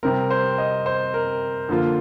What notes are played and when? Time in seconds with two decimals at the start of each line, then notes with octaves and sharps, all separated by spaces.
0.03 C3 G3 C4 A#4
0.31 C5
0.58 D#5
0.86 C5
1.14 A#4
1.69 D3 F3 A#3 F4